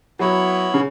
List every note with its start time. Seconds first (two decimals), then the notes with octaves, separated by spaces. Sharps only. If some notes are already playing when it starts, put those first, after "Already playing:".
0.19 F#3 B3 E4 C#5
0.74 C#3